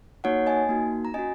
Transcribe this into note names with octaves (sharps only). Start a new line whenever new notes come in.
A#3 D#4 F#4 C#5 F#5
D#5 G#5
A#3 D#4 F#4
A#5
C#4 F#4 D#5 G#5